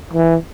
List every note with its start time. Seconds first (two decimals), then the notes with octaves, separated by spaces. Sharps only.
0.13 E3